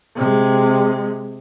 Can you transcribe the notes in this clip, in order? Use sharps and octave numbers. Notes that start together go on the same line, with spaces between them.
C3 G#3